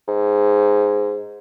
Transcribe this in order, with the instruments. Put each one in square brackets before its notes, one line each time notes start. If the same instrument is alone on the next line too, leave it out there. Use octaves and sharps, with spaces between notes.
[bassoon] G#2